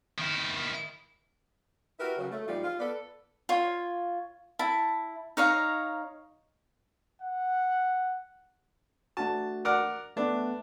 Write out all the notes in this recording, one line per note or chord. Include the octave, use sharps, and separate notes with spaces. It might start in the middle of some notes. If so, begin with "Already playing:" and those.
D#3 E4
E4 F#4 G4 A#4 B4
C#3 F#3
A3
A#2 F3 G3 G#3 D#4 F4
F4
B3 A4 B4 D5
F4 C#5
E4 A5
D#4 C#5 F5 A#5
F#5
A3 D4 F#4 A5
A#4 D5 F#5
A3 B3 D4 B4